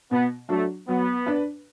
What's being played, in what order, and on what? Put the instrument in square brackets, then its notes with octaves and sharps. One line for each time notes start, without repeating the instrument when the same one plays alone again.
[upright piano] B2 [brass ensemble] B3
[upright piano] F#3 D4 F#4 [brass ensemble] A3
[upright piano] F#3 [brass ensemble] B3
[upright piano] D4 B4